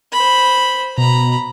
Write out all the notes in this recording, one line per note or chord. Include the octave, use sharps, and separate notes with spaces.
C5 B5
B2 A#5 B5